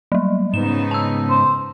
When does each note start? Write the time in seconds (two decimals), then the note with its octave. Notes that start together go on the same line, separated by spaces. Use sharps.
0.12 F#3 G3
0.54 G#2 C#3 B3 D#4 E7
0.91 A5 E6
1.30 C5